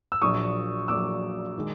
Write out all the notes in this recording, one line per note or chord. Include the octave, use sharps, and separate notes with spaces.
E6
A#1 A#2 F#3 C#6 D#6
A#1 A#2 F#3 D6 E6
D#3 G#3